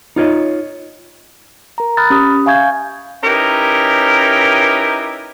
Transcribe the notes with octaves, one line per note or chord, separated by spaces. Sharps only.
D#4 F4 C#5 D#5
A#4 A#5
B5 D#6 F6 F#6 A6
C#4 G4 D#6
E5 F5 G#5 C#6 G6 G#6
C#4 D#4 E4 G4 A#4 B4